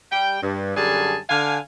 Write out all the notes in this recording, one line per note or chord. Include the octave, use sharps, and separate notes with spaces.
G3 G5
G2
F#2 D3 G3 G#4 G#5 A5
D3 F5 G#5